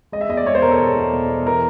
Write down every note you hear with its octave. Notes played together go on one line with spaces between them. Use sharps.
G#3 D#5
E5
E2 D#5
D5
G#3 C#5
C5
B2 A#4
A4
E2
E2
B2
E2
E3 A#4